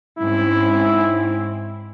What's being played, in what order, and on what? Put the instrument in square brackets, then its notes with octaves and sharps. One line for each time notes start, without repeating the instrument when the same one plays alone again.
[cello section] G#2 C4 C#4 [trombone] E4